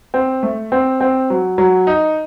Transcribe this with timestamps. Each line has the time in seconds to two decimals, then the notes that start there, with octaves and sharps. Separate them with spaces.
0.14 C4
0.43 A3
0.72 C4
1.01 C4
1.30 F#3
1.58 F#3
1.87 D#4